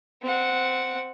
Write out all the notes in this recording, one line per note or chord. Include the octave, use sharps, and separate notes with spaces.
C4 F#5